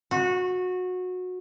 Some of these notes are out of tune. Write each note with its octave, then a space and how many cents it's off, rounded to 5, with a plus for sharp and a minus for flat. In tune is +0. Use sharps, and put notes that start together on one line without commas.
F#4 -20